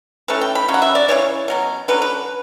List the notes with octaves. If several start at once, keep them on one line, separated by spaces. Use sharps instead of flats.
E3 A3 C#4 B4
G5
B5
C#3 F#3 C#4
F#5
E5
D5
C#3 E3 B3 C#5
B2 F#3 C#4
D3 F#3 C#4 B4
B4